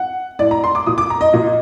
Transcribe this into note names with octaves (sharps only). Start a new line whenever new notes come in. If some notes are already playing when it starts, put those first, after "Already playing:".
Already playing: F#5
A2 D5
A#5
C6
D6
A#2 D#6
D6
A#5
D#5
A#2 D#5